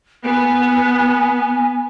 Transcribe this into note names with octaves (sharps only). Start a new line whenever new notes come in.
B3 G#5